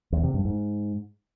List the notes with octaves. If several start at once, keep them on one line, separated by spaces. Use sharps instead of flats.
E2
C3
G2
G#2